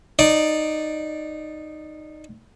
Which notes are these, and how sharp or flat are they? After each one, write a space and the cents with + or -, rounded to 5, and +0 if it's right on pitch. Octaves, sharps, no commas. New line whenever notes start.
D#4 -10 D5 +0